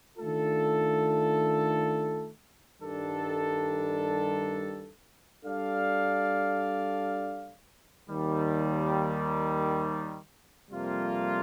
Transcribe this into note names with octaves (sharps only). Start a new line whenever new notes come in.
D#3 A3 D4 F4 A4
G2 D#3 G3 D4 A4
G3 D4 A4 D5 F5
D#2 D#3 G3
F2 C3 G3 A#3 F4